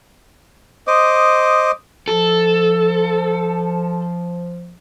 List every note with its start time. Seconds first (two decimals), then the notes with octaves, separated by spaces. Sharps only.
0.87 C5 D#5 D6 D#6
2.08 F3 A4